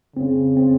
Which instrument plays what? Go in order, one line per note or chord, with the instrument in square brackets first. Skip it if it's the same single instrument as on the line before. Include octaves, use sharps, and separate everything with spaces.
[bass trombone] C#3 [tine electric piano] C4
[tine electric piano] C4